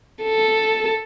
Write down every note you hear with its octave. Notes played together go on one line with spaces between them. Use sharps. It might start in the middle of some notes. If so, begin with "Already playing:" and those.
A4